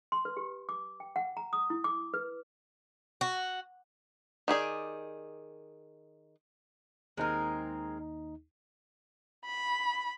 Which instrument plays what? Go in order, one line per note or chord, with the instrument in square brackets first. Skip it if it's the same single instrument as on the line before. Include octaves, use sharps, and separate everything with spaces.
[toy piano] C6
B4
G4
D6
G5
F#5
A#5
D#6
E4
D6
B4
[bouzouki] F#4
[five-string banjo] D#3 G4 G#4 D5
[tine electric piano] D#2 D#4 [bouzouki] G#3 C4 A#4
[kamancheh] B5